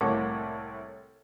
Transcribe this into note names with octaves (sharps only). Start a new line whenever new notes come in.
C2 A2 A#3 C#5 F#5 D6